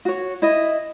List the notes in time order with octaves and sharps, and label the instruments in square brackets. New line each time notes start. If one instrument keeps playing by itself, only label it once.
[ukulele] F#4 C#5
E4 D#5